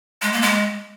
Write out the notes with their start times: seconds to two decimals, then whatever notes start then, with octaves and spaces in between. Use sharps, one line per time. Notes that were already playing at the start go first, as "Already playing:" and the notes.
0.22 G#3
0.32 A#3
0.42 G#3